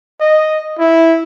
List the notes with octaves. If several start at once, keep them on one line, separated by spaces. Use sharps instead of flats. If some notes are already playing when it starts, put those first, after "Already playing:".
D#5
E4